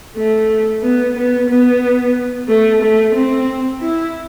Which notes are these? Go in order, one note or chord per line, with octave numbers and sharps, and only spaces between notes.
A3
B3
B3
B3
A3
A3
C4
E4